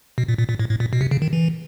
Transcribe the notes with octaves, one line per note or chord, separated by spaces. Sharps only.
B2
A#2
A#2
A#2
A2
A2
A#2
B2
C3
C#3
D#3
E3